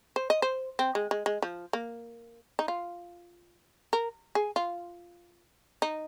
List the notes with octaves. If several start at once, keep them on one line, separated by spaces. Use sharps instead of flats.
C5
D#5
C5
C4
G#3
G#3
G#3
F3
A#3
D#4
F4
A#4
G#4
F4
D#4